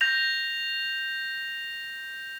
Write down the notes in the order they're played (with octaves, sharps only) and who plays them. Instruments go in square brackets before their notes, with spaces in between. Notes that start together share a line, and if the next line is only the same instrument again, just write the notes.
[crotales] G6 A#6 F7